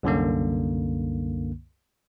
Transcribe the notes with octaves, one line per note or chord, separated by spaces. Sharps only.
C2 F#2 D3 A#3